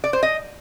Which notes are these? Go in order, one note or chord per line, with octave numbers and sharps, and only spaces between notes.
D5
C5
D#5